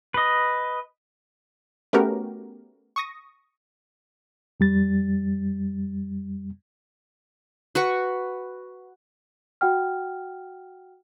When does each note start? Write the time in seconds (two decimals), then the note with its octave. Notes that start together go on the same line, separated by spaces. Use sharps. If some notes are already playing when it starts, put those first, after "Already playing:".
0.14 B4 D#5
1.93 A3 B3 C#4 F#4 G4 A#4
2.96 C#6 D#6 A#6
4.60 F2 G3 A6
7.75 F#4 B4 C#6
9.61 F#4 F#5 G5 F6